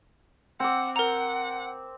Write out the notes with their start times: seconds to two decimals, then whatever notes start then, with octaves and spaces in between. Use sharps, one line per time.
0.60 C4 F#5 D6
0.96 A#4 F#5 A#5